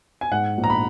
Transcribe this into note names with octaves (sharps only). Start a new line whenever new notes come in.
G#5
G#2 F#5
A#1
A#5
B5